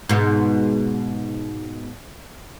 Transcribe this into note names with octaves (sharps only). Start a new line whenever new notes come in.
G#2 B2